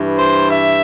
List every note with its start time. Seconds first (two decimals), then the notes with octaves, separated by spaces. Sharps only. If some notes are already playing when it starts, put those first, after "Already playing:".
Already playing: G2 E3
0.17 C5
0.50 E5